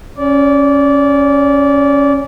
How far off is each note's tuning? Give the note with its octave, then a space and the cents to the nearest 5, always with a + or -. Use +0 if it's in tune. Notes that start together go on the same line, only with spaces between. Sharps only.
C#4 +0 D5 -25